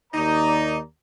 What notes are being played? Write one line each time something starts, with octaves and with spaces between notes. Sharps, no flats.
D#2 D#4 D5 A#5